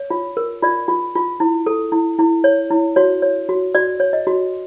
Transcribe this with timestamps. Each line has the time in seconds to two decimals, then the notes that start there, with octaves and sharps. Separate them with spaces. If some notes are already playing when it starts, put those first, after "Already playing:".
Already playing: C#5
0.10 F4
0.37 A#4
0.62 F4 D5
0.88 F4
1.15 F4
1.40 E4
1.66 A4
1.92 E4
2.19 E4
2.44 C#5
2.71 E4
2.96 F#4 C#5
3.22 C#5
3.49 F#4
3.75 F#4 D5
4.00 C#5
4.13 D#5
4.27 F#4